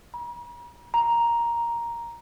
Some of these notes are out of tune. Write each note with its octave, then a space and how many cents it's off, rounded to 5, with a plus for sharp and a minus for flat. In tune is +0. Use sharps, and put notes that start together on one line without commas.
A#5 +45
A#5 +5